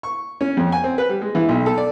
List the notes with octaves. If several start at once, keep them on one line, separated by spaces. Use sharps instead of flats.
C#6
C#4
F2
G#5
C4
B4
G3
G#3
E3
B1
A4
D5